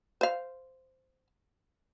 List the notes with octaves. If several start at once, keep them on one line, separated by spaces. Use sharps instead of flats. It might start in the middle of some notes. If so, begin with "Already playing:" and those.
C5 F5